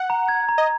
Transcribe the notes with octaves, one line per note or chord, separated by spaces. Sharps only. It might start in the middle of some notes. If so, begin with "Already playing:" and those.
Already playing: F#5
A#5
G#6
A#5
D#5